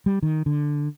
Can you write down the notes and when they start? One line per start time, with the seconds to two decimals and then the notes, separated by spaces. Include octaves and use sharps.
0.06 G3
0.23 D#3
0.46 D3